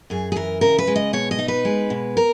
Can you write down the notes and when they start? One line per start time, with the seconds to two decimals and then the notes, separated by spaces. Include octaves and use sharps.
0.10 F#2 G#4
0.32 G#4
0.35 E3 A#4
0.61 C#3 A#4
0.78 B4
0.87 G#3
0.96 D#5
1.13 B2 C#5
1.31 D#5
1.39 D#4
1.48 B4
1.65 G#3
1.90 B2
2.17 A#4